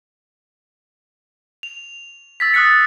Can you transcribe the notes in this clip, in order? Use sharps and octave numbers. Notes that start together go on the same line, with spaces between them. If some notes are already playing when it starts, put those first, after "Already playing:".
F7
E6 A6 B6
D#6 E6 F#6 A6 C#7